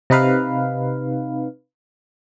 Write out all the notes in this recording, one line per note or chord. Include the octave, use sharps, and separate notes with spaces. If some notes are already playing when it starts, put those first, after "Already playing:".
C3 D#4 B4 F5